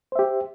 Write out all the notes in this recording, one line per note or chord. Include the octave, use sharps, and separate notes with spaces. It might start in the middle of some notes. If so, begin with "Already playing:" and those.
G4 C5 E5